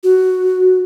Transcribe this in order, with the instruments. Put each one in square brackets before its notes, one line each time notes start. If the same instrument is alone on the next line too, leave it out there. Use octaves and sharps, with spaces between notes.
[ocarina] F#4